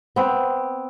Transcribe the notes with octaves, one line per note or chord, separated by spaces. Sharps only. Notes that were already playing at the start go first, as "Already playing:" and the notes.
B3 C4